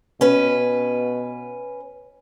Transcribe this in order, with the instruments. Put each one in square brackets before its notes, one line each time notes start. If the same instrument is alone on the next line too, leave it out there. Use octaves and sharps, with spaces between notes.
[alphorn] B2 [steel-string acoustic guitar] C#4 B4